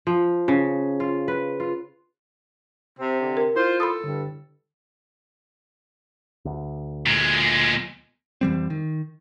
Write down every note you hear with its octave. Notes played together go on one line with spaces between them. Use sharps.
F3
C#3
F4
B4
F4
C3 C4
D3
A#4
E4 F4 C5
A4 B5 C6 D#6
G2 D3
D2
A#2 G#3
F2 E3 G3 C4
D#3